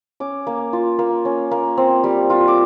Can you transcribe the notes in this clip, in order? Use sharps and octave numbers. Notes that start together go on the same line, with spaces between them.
C#4 D6
A#3
F4
A#3
C#4
A#3
C4
G3
F4
D6